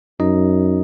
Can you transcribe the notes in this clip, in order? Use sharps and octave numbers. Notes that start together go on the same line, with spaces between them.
F#2 D#4 D#5